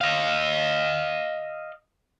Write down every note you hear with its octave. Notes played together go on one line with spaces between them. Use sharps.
D#5 F5